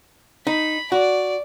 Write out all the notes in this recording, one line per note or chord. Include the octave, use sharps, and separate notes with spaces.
D#4 B5
F#4 D5